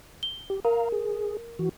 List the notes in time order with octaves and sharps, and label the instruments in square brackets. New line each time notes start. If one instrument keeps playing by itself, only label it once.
[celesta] G7
[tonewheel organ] G4
[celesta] A#4 [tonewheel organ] F5 A#5
[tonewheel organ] G#4
E3 F#4